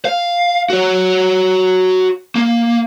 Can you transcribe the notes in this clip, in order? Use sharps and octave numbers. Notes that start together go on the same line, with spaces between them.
F5
F#4 C#5
A#3